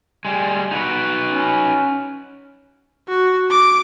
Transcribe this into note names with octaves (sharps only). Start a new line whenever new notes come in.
G3 G#3
D#4 F#4 B4
C#4
F#4
D6